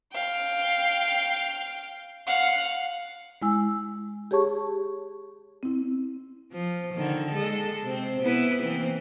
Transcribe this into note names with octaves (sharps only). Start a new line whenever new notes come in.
F5 G5
F5 F#5
G#3 E4 G#5 E6
G4 G#4 C#5 A5 C#6
C4 E4
F3
D3 D#3
G#3 A4
C3 C4
B3 E4 B4
E3 A#3 C4